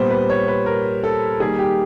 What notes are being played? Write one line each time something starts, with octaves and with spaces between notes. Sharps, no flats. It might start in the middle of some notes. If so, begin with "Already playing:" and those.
Already playing: A#2 G3 B3 C5
B4
C#5
B4
A#4
A4
D#3 G3 A#3 G#4
G4